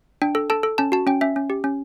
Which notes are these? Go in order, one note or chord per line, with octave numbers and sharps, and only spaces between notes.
D4 G5
A4
A4 A5
A4
C#4 A5
F#4 A5
C#4 G5
C#4 E5
C#4
G4
C#4